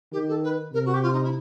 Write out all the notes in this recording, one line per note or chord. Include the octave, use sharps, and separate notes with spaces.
D#3 G4
A4
B4
C3 A#4
F#4
G4
F4
D#4
E4